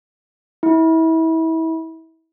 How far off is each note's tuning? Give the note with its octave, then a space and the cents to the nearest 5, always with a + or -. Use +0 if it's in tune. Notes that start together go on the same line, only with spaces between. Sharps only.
E4 -30